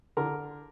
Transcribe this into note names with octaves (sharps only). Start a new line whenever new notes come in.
D3 A#4